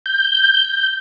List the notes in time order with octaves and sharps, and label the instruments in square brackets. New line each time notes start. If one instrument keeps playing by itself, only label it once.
[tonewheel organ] G6